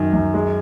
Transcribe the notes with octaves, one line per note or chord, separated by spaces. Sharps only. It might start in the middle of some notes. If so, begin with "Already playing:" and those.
Already playing: F#2 D#3
F#2
G#3